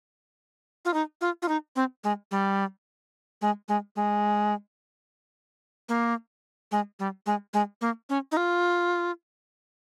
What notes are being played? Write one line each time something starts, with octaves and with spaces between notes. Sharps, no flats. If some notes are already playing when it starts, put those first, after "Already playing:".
F4
D#4
F4
F4
D#4
C4
G#3
G3
G#3
G#3
G#3
A#3
G#3
G3
G#3
G#3
A#3
C#4
D#4
F4